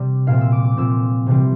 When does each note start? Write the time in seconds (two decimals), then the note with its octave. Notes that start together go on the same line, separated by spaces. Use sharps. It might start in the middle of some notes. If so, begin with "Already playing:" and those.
Already playing: C3 G3 C4 D5
0.27 A#2 F3 C4 F5
0.41 E6
0.52 D6
0.64 D6
0.77 A#2 F3 C4 E6
1.27 C3 E3 G3 C4